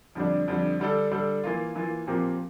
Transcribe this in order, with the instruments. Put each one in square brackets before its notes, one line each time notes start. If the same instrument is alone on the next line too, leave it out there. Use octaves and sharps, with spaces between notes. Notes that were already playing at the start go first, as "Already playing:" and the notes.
[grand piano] F2 D3 G3 D4
F2 D3 G3 D4
D3 G3 D4 A4
D3 G3 D4 A4
E3 A#3 F4
E3 A#3 F4
A#2 F3 C4 G4 A#4